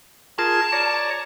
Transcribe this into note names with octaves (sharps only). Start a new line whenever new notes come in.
F4 G#4 A#4 A5
C#5 D5 A#5